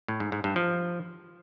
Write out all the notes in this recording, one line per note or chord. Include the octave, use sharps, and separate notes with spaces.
A2
G#2
G#2
G2
F3